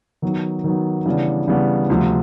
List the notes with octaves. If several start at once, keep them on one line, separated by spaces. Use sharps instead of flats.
D#3 F#3 B3
D#3 F#3 B3
C#3 E3 G3 B3 D4
C#3 E3 G3 B3 D4
D2 C3 F3